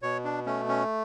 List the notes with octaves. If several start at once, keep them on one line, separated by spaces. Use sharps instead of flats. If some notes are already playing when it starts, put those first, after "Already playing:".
B2 C#5
D4
A3 C#4
C#4